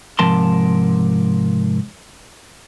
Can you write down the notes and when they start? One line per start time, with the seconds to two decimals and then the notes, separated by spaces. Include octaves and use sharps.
0.19 G#2 C3 F3 A#4 A5 C6